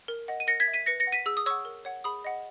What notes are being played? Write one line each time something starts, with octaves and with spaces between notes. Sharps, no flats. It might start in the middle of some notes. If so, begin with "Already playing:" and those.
A#4
D#5 F#5
D#7
A#4 A#6 C#7
G#6 B6
E5
B6 D#7
B4 A#6 C#7
A#6 C#7
F#5
B6 D#7
G#4 E6
D#6
C#5 F#5 C#6 E6
A#4
C#5 F#5
G#4 B5 D#6
D#5 F#5